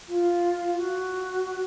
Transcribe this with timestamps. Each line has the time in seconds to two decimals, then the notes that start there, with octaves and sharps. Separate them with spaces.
0.09 F4
0.77 F#4